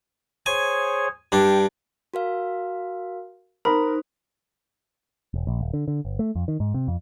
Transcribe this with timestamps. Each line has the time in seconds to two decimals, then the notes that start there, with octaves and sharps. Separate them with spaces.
0.46 G#4 C5 C#5 G#5
1.32 G2 D4 G5
2.14 F#4 A#4 F5
3.65 D#4 A#4 C5 B5
5.34 E1
5.47 A#1
5.61 D#1
5.73 D3
5.88 D3
6.05 G1
6.19 A3
6.35 F2
6.48 D#3
6.60 G#2
6.74 C3
6.88 F2